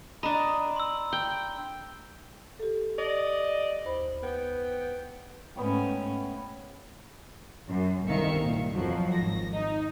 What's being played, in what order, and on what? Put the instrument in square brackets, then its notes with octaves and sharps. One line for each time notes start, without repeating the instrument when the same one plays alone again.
[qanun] D4 D#5 [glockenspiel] A#5 B5
[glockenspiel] C6 E6
[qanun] G5
[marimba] G4 A4
[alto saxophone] D5 [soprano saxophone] D#5
[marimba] D#2 C5 B5
[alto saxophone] B3 [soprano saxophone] G5
[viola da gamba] G#2 A3 C#4 [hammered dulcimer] B3 C#5 G5
[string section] F#2
G1 C2 D#3 E5 F5 C#7
A#2
F2 F3 F#3
G#1 A#6
D#4